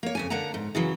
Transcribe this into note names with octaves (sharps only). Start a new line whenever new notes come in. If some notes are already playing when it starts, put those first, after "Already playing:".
A#3 C#5
F2 C#3 G#5
D3 A#3 D4 F#5 A#5
G#2
C#3 E3 F#3